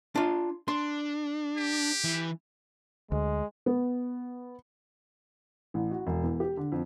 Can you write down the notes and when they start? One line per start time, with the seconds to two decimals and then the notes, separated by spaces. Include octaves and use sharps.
0.15 D4 F4
0.68 D4 C6
1.58 G4
2.04 E3
3.12 D2 G#3
3.66 B3
5.74 A1
5.91 F#4
6.07 E1
6.23 E2
6.40 G4
6.57 D3
6.72 F2